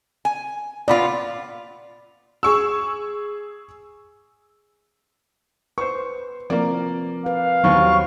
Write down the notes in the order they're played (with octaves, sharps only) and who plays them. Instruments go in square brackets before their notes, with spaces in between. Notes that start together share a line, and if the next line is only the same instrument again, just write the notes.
[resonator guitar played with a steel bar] G#5
[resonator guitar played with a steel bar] A#2 B3 F4 [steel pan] D5 B5
[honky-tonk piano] G#4 C#6 E6
[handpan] B4 [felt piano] C5 C#6
[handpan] F3 C4 A#4 [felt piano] A#3 D5
[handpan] B4 [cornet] F5
[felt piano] D#2 G3 B3 [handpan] F#3 C5 [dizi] C#6